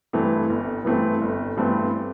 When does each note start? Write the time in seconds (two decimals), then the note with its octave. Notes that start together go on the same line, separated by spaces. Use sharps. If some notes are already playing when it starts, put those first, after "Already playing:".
0.13 G2 E3 A3 C4
0.50 G1
0.85 G2 E3 A3 C4
1.21 G1
1.57 G2 E3 A3 C4